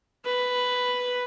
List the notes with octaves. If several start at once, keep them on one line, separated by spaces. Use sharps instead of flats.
B4